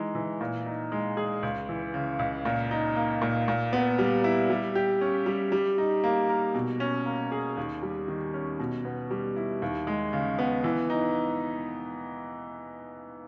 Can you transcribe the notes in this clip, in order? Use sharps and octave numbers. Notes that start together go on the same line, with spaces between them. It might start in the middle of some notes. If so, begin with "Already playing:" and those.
Already playing: E3 G#3 D#4
E3
A#2
D#4
G#3
G#4
C#2
E3
C#3
C#2
A#2
D#4
A#3
A#2
A#2
B3
G3
E4
G3
G4
C#4
G3
G3
D#4
A#3
A#4
B2
C#4
A#3
G#4
D#2
G3
D#3
C#4
B2
B3
G3
E4
D#2
G#3
C#3
B3
E3
D#4